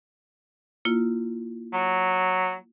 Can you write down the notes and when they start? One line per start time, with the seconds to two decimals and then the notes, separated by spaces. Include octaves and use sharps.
0.85 A#3 E4 F4
1.73 F#3